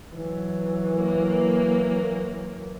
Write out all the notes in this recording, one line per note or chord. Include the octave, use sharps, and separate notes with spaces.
E3 F#3
A#3